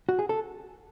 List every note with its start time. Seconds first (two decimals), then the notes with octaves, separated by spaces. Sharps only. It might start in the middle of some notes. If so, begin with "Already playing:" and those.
0.09 F#4
0.19 G#4
0.29 A4